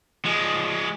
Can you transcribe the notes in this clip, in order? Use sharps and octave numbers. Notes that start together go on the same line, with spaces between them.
F3 G#3